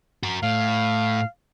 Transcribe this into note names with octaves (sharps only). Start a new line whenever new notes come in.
F#4 A#4
A2 F5